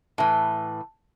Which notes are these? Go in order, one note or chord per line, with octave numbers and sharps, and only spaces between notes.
A2 E3